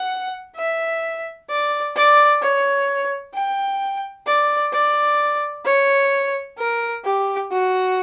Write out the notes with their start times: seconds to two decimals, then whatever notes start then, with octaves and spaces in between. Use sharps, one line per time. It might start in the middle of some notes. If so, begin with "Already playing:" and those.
Already playing: F#5
0.56 E5
1.49 D5
1.96 D5
2.42 C#5
3.34 G5
4.27 D5
4.73 D5
5.65 C#5
6.58 A#4
7.05 G4
7.51 F#4